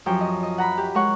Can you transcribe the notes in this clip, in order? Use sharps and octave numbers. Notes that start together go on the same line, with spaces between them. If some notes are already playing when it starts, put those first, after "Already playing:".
F#2 F3 G4 G5 C#6
D#5
D#5
F#5 A#5 B5
G4
G#3 A#4 C#5 F#5 C#6